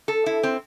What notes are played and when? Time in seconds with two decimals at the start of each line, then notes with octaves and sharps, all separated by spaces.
0.08 A4
0.26 E4
0.43 C4